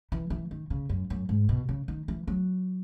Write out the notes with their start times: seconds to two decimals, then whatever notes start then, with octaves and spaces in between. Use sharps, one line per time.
0.12 E3
0.30 E3
0.51 D#3
0.70 C#3
0.89 F#2
1.10 F#2
1.29 G#2
1.49 B2
1.69 C#3
1.88 D#3
2.08 E3
2.27 F#3